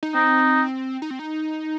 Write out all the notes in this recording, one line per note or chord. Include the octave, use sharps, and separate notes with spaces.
D#4
C4 D#4
D#4
C4
D#4